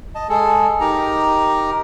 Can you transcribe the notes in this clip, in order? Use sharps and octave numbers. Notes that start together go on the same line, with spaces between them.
D#5 A5
G#3 G#4 A4
D#4 G4 A#4 A#5